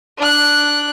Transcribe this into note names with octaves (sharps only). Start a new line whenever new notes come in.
D4 F#6